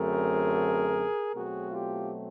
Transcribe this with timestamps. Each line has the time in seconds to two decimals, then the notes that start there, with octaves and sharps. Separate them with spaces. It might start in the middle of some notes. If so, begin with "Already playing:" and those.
Already playing: F#2 D3 F#3 A3 C4 G#4 A#4
1.35 B2 F#3 A3 C4 F#4 G#4
1.71 F4 G4